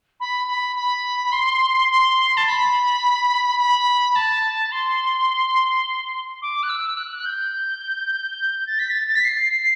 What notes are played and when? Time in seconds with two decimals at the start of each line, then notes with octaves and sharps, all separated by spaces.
0.20 B5
0.47 B5
0.76 B5
1.32 C6
1.89 C6
2.37 A5
2.46 B5
3.59 B5
4.15 A5
4.71 C6
6.42 D6
6.63 F#6
6.69 E6
6.92 E6
6.97 F#6
7.16 F#6
7.25 G6
8.66 A6
8.79 B6
8.90 A6
9.08 A6
9.15 B6
9.24 C7